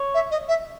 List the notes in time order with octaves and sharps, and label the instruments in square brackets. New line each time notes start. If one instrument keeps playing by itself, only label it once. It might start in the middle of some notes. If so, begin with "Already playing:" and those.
Already playing: [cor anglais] C#5
[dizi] E5
D#5
E5